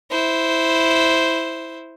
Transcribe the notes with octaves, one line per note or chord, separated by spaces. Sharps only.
E4 C5